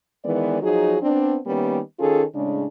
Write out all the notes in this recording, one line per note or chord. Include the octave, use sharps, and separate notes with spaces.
D#3 E3 G#3 B3 D5
F3 F#3 D#4 F#4 G#4
B3 C4 D4
D#3 G3 A#3 B3 C#4
D#3 C#4 F4 G#4 A4
A2 C#3 G#3 D4